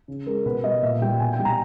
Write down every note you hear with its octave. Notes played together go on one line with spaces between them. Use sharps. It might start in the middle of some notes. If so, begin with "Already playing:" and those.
C#3
G#3 A#4
B2 B4
G3 D#5
A#2 E5
G3 G5
B2 G#5
G5
G3
A#5